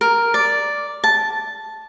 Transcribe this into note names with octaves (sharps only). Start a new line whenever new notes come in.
A#4
D5
A5